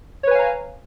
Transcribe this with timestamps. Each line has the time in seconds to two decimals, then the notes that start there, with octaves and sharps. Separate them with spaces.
0.23 C#5
0.27 B4
0.31 G#5
0.35 F5
0.39 A#5